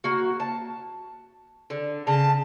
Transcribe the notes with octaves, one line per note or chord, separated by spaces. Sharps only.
A#3 F#4
A5
D3
C#3 A5 A#5